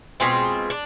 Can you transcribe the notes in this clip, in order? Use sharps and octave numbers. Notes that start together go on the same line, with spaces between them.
B2 G#3 C4 F4
D4